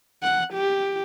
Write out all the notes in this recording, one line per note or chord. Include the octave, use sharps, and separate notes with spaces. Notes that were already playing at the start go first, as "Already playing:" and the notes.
F#5
G4